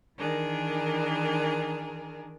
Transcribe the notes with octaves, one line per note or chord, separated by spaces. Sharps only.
D#3 E3 D4 G#4 A#4